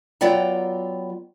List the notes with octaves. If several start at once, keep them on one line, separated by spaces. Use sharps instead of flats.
F#3 B3 F4 D5 G5 A#5